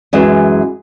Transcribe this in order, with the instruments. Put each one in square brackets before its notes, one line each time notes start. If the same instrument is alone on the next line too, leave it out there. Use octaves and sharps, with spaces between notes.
[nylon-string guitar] F#2 E3 G#3 E5